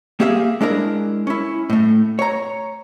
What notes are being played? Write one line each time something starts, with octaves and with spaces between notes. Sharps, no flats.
A#3 C4 G4 G#4 E5 F5
G#3 D4 E4 A#4
C#4 E4
A2 A3
C#5 A#5